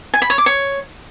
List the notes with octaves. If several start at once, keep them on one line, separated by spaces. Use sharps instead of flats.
G#5
B5
C#5
D6
C#5